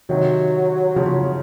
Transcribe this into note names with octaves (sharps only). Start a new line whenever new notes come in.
C3 D#3 F#3
C#3 F3